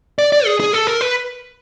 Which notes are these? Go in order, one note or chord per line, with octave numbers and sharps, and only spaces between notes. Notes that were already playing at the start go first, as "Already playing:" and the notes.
D5
D5
G#4
G#4
A4
A#4
B4